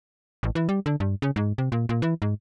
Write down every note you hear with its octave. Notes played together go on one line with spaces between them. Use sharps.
A1
E3
G3
D3
G2
C#3
G#2
C3
A#2
A#2
E3
G#2